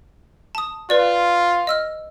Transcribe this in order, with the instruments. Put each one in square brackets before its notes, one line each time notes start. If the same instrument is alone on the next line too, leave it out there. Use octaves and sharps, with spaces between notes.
[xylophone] A5 D#6
[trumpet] F4 [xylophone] B4 D5
[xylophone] D#5 E6 F6